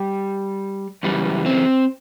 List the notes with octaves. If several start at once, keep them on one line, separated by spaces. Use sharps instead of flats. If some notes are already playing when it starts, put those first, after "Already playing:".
Already playing: G3
F#2 C#3 E3 G3
C4